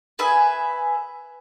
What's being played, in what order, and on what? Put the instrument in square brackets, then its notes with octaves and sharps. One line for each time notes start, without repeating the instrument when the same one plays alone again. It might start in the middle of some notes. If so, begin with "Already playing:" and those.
[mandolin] G#4 B4 E5 G#5